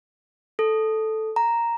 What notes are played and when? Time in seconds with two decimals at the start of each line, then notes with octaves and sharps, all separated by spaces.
0.59 A4
1.36 A#5